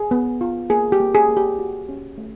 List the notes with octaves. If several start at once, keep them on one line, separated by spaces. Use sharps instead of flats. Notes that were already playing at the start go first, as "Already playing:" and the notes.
Already playing: G#4
B3
F4
A#3 G#4
G4
A#3
G#4
A#3
G4
F#4
C#4
A3